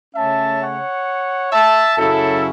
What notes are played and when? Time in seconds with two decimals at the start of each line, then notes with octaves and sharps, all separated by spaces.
0.14 C#3 A3 C#4 E5 A5
0.61 C#5 F#5
1.52 E5 A5
1.98 F#2 C#3 F#3 C#4 E4 A4